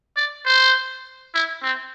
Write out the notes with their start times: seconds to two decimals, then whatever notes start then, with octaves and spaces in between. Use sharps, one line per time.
0.17 D5
0.46 C5
1.34 E4
1.63 C4